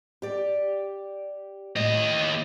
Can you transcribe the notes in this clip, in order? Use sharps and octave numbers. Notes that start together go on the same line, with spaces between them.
G4 D5
D#2 A2 D#5